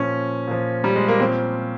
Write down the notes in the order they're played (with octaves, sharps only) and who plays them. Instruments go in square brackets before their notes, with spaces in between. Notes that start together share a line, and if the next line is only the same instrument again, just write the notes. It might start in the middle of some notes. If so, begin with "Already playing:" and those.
Already playing: [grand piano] A#2 F3 C#4
A#2 F3
G3
G#3
A#3
A#2 F3 C4